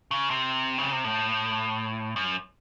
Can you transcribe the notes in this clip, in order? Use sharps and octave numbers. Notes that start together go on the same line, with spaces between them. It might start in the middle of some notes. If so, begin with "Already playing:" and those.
C#3
C3
C#3
C3
A2
F#2